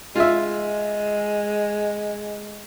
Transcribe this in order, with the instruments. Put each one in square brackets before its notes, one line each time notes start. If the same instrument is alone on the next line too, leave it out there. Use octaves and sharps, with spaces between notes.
[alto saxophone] G#3 [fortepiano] F4 E5